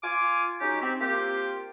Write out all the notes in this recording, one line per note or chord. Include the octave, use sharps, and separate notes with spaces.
F4 G#5 D6
G#3 C#4 D#4 F#4 G4
C4 G4
A#3 C4 F4 G4